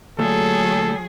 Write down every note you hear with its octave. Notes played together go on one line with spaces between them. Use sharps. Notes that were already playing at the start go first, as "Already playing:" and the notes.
D2 A#2 F#3 A3 G#4 A4